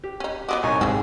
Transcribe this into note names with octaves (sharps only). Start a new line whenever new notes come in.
G4
C#4 D#4
F#3 B3 F#4 D#5 D6
C2 D#4 C#5 G#5
G#2 E3 F#3 C4 G#4